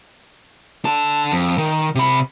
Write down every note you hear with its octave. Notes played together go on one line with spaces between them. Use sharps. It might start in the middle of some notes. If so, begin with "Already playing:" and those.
D3 A5
F2
D#3
C3 B5